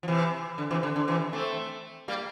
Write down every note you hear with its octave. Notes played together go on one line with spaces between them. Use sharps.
F3
C3 E3
D3
C3 E3
D3
D3
C3 E3
A3 C4
G3 A#3